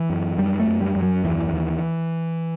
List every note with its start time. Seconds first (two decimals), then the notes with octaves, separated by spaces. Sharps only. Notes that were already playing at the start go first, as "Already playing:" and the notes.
Already playing: E3
0.10 F#2
0.38 F#2 G3
0.60 A3
0.67 F#2
0.82 G3
0.96 F#2
1.02 F#3
1.24 D#2 E3
1.53 D#2